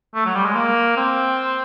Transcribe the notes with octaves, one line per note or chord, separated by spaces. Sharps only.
A3
F#3
G3
G#3
A#3
C4